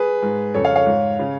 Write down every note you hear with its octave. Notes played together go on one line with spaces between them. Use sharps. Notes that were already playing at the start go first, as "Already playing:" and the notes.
Already playing: G#4 B4
G#2
F2 C#3 A4 C#5
C#5 F5
C#5 F5
G#2
C#3